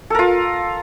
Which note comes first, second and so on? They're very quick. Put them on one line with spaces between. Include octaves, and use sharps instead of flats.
A4 A#4 F4